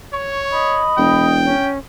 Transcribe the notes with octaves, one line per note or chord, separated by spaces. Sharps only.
C#5 C#6
D#5 B5
E1 G5
C#4